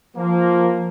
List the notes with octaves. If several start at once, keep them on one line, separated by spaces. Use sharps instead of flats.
F3 A#3